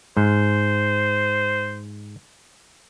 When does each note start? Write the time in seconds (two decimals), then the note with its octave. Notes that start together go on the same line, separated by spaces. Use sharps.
0.17 G#2 C5